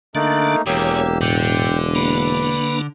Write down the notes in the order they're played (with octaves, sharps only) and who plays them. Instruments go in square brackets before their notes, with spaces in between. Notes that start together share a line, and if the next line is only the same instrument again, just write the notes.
[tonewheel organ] D3 D4 [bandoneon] A3 A#3 D#4
[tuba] E1 [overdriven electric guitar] E2 [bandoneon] A#3 G4 E6 [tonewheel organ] C#5
[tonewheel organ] A2 [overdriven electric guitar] D3 [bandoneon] G5
[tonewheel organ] A#3 D4 [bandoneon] B4